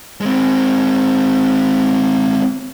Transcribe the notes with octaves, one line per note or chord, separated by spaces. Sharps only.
G#3 C4